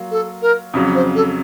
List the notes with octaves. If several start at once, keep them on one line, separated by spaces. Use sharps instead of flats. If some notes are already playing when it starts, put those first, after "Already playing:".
Already playing: F#3 A#3 F4
A4
A#4
F2 C#3 F#3
C5
A4